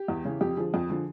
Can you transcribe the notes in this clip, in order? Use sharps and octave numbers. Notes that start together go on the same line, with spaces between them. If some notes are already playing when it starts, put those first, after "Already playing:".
Already playing: G4
E2
C#3 E3
F2 G4
D3 F3 G#4
F2
D3 F3